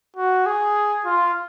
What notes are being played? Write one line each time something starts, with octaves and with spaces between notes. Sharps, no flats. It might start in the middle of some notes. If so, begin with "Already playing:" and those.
F#4
G#4
F4